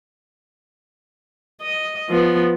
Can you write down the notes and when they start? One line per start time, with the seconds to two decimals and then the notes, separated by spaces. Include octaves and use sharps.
1.62 D#5
2.09 F3 B3